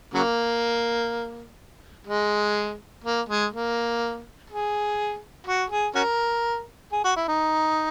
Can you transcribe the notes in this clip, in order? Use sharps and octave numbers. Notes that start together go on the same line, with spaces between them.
C#3 F#3 A#3
G#3
A#3
G#3
A#3
G#4
F#4
G#4
C#4 F#4 A#4
G#4
F#4
E4
D#4